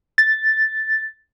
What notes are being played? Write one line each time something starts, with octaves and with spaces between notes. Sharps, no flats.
A6